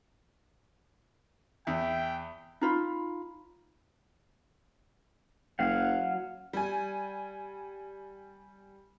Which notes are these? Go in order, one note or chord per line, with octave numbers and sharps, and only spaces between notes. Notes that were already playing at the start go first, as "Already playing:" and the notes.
E2 E5 G5
D#4 F4 B5
F#1 F#3 F5 F#5
G3 G#5